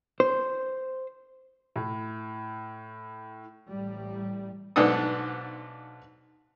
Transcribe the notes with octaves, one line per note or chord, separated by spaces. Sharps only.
C5
A2
A1 A2 G3
B1 G#2 B3 D4 A4 D#6